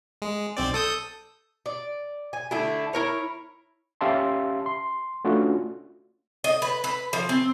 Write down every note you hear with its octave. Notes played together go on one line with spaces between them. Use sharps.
G#3
B1 C4 D5
A4 D#6 G6
D5
G#5
D3 A3 D4 E4
E4 A#4 C#5
C#4 G4 E5 F5 A5 C6
C6
A3 C#4 D4 F4 F#4
D#5
B4
B4
F3
C4